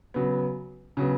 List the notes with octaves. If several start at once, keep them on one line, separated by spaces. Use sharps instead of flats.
C#3 F#3 B3
C#3 F#3 B3